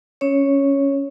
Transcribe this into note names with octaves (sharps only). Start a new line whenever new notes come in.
C#4 C#5